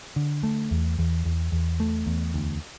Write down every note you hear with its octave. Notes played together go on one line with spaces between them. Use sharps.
D3
A3
E2
E2
E2
E2
A3
E2
D2